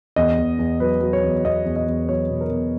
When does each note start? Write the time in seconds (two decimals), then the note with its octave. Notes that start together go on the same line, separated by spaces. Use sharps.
0.16 E2 D#5
0.38 E2
0.59 E2
0.80 F#3 B4
1.01 F#3
1.13 C#5
1.24 E2
1.45 E2 D#5
1.65 E2
1.76 D#5
1.87 E2
2.09 F#3 C#5
2.30 B2
2.41 A#4
2.50 B2